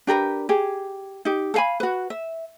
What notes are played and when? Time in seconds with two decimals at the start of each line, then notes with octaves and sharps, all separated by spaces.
0.07 D4 G4 A#4 B4
0.49 G4 G#4
1.25 D#4 G4
1.54 A4 F5 G#5 B5
1.80 F#4 B4
2.10 E5